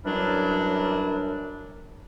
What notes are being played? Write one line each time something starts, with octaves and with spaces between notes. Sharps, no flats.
F#2 E3 F#3 G3 D4